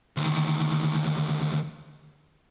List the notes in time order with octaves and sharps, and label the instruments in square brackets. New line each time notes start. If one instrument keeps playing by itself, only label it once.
[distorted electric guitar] D2 D#3